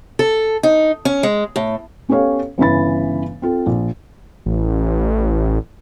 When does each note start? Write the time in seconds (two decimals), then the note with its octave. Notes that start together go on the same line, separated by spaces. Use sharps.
0.19 A4
0.63 D#4
1.05 C#4
1.23 G#3
1.56 A2
2.09 B3 C#4 G4 A4 C#5 F5
2.58 G1 C#3 E3 B5 A6
3.42 C4 F4 A4
3.66 A#1
4.46 A1